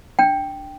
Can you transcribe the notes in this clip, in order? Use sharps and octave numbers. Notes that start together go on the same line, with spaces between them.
D4 G5